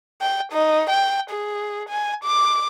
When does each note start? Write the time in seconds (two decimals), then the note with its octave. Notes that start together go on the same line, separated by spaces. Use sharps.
0.21 G5
0.53 D#4
0.89 G5
1.31 G#4
1.89 G#5
2.24 D6